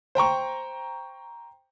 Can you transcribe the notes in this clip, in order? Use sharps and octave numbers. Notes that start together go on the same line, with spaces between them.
C5 G5 A#5 C#6